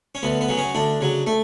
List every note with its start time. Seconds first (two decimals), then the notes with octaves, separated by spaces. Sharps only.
0.15 C#4
0.23 D2 B3
0.41 B3
0.49 C#3 F#3
0.57 C#4
0.75 D2 D4
1.01 C#3 F#3
1.27 A3